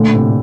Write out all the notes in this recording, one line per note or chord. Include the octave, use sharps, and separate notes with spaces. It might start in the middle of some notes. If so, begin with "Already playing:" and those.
Already playing: A#2 D3 A3
A2 C3